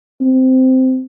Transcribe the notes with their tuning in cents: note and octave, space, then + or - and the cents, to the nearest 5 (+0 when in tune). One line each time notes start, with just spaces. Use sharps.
C4 -10